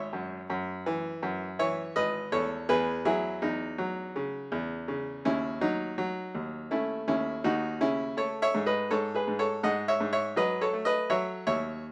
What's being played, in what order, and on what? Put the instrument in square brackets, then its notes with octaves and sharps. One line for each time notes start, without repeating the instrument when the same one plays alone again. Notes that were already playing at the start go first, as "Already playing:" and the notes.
Already playing: [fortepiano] G#1 C#5 E5
F#2
F#2
E3
F#2
E3 C#5 E5
G#1 B4 D#5
E2 A4 C#5
E2 G#4 B4
F#3 E4 G#4
E2 D#4
F#3
C#3
E2
C#3
D#2 C#4 E4
F#3 D#4
F#3
D#2
A3 C#4 E4
D#2 C#4 E4
D#2 D#4 F#4
C#3 C#4 E4
A3 A4 C#5
C#5 E5
G#2
B4 D#5
G#2 A4 C#5
G#4 B4
G#2
A4 C#5
G#2 D#5 F#5
C#5 E5
G#2
C#5 E5
F#3 B4 D#5
A4 C#5
A3
B4 D#5
F#3 C#5 E5
D#2 C#5 E5